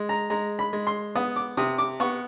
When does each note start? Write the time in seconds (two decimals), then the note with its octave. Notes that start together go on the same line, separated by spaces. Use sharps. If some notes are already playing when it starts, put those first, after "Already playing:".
Already playing: G#3
0.09 A#5
0.30 G#3 A#5
0.59 B5
0.73 G#3
0.87 C6
1.15 B3 D#6
1.36 D6
1.57 C3 D#6
1.78 D6
2.00 B3 C#6